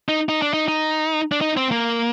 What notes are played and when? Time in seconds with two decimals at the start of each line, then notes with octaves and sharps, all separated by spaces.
0.09 D#4
0.29 D#4
0.42 D4
0.54 D#4
0.68 D#4
1.32 D4
1.41 D#4
1.57 C4
1.71 A#3